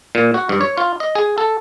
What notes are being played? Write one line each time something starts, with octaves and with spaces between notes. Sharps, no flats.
A#2
F#4
G2
C#5
F4
D#5
G#4
A4